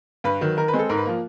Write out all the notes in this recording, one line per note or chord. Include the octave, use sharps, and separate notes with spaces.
G2 B4
D#3 F#3
D#3 A#4
B4
G#3 C4
A4
G#2 A#4
B4
F3 A#3